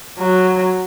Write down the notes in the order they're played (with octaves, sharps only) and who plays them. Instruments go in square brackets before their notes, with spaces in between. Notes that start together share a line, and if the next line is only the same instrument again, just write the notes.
[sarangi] F#3